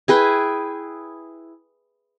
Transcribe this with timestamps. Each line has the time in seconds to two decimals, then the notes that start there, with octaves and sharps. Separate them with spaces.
0.08 E4 G#4 B4 G5